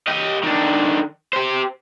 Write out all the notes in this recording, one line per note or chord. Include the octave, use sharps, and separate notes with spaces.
G4 D#5
D#3 D4
G4 C5